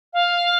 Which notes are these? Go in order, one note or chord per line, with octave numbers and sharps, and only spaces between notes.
F5